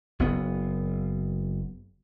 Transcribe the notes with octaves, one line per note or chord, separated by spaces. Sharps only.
F#1 B3